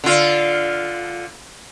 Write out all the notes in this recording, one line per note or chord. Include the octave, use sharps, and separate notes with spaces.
D3 F4